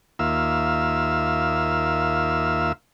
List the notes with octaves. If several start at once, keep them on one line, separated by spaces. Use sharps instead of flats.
D#2 A#3 F4 E5 F5 E6